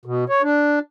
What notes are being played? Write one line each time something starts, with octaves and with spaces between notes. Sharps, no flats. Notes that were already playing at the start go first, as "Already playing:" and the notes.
B2
C#5
D4